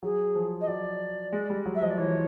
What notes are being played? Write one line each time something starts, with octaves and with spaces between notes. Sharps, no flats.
F#3 G#4
F3
D#5
F#3 D5
G#3
G3
F#3
E5
F3 D#5
D5
E3 C#5